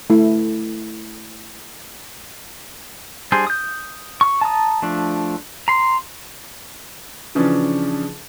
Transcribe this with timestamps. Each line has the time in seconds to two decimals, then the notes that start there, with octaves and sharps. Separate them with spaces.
0.10 A3 E4
3.32 G3 D4 G#4 C5
3.47 D#6 G6
4.21 C#6
4.41 A5 A#5 D#6
4.82 F3 A3 D4
5.68 A#5 C6
7.35 C#3 E3 F3 C#4 D4